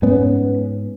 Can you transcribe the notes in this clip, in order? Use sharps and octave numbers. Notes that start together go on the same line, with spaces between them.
G#2 B3 C#4